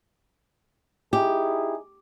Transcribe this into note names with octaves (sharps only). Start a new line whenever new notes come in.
D#4 E4 G4 G#4